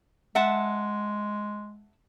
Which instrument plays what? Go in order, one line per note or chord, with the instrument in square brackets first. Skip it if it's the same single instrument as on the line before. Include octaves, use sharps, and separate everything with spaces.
[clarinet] G#3 [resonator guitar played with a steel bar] E5 F#5 A5